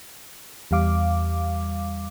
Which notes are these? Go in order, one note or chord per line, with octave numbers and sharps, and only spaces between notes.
E2 G3 F5 D6